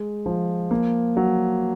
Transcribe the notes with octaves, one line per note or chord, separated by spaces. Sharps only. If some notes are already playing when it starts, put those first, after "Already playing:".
Already playing: G#3
F3
A#3
F#3